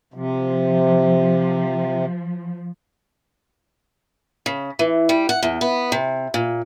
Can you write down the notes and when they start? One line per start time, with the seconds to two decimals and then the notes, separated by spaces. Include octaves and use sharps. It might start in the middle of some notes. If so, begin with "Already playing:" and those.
0.14 C3 F3
4.46 C#3
4.79 E3
5.09 G3
5.29 F#5
5.43 E2
5.61 B3
5.92 C3
6.34 A#2